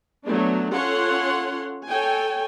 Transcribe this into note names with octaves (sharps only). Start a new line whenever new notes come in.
F#3 A3 B3 D4
C#4 F4 A4 C#5 F#5 C6
A4 C#5 G5 G#5